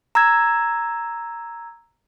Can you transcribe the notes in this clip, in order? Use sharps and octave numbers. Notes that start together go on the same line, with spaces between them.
A#5 E6 G#6